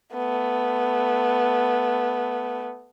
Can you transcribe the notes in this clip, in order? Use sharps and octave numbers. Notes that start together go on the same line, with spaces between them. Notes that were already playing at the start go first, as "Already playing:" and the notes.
A3 B3